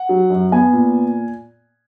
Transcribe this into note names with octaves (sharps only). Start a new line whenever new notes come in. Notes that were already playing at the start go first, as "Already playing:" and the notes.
Already playing: F#5
F#3
F#2
B3 G#5
A#2